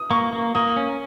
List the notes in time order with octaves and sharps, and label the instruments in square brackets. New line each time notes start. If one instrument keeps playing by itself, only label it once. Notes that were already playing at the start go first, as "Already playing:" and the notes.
Already playing: [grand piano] D#6
[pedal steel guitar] A#3 [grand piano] C#6
[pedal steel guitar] A#3
[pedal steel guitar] A#3 [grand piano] D#6
[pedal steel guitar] C#4